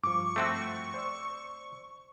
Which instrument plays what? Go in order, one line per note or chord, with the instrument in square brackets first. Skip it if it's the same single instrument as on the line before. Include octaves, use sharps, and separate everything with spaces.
[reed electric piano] G2 F3 [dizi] C#6 [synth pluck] D6
[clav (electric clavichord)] A3 C4 F#4
[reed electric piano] C5 D5 E6